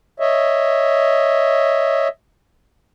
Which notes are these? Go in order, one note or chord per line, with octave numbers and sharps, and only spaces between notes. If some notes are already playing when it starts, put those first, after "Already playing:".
C#5 D#5 E5